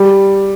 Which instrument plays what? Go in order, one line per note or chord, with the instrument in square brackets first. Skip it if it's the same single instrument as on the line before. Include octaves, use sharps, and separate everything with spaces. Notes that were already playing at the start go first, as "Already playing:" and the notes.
Already playing: [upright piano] G3